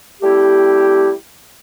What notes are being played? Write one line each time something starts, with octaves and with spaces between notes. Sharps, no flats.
G3 A3 C4 E4 G4